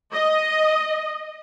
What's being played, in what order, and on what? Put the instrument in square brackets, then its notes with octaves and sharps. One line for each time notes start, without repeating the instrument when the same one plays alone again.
[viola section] D#5